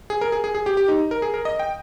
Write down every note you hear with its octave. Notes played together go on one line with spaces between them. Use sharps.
G#4
A#4
G#4
G#4
G#4
G4
G4
D#4
A#4
G#4
A#4
D#5
G5